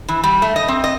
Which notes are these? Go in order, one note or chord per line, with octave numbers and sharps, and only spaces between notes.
E3
G3
A3
D#5
C4
D#5